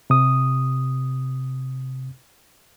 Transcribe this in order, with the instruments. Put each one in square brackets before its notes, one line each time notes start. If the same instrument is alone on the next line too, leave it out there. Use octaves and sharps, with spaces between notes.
[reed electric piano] C3 D#6